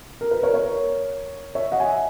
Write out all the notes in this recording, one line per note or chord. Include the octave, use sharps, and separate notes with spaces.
A#4
B4
A#4 C#5
A#4 C#5
C#5 E5
D#5 F#5
E5 G#5